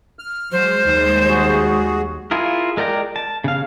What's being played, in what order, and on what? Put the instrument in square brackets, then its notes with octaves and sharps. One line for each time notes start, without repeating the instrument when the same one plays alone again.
[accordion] F6
[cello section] F#3 G#3 [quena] C5
[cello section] D#2 G3 G#3
[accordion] F#4 G#4
[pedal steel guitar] E4 F4 G#4 A#4
G#3 A#4 D5 G5 A#5
A5
C#3 F5